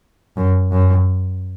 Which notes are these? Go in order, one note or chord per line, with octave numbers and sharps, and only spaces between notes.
F#2
F#2